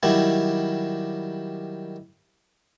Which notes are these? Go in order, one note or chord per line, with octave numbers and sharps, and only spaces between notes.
D#3 F#3 G3 E4